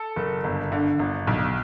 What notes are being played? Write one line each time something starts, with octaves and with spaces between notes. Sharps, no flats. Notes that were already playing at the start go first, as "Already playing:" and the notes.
Already playing: A4
F#1
G1
D3
G1
B1